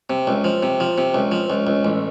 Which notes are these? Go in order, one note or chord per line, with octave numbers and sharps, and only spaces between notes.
C3
C#2
F3
C3
F3
C3
C#2
F3
C#2
C#2
A1